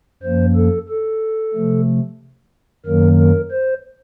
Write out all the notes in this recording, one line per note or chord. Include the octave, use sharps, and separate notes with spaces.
F#2 F3 A#3 C5
A4
A4
C3 F3 A3
F#2 D#3 F#3 A#3 A#4
A#4
C5